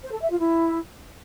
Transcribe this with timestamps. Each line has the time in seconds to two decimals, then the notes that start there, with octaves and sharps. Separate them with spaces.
0.03 C5
0.12 A4
0.21 E5
0.30 F4
0.39 E4